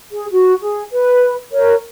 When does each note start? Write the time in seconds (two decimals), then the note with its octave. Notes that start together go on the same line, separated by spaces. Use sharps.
0.11 G#4
0.32 F#4
0.61 G#4
0.92 B4
1.52 A#4 C#5